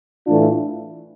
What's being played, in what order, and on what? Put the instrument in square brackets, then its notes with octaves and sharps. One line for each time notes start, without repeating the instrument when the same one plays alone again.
[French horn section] A2 E3 A3 D4 F4